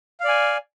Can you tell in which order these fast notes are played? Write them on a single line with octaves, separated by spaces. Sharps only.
F5 D5 G#5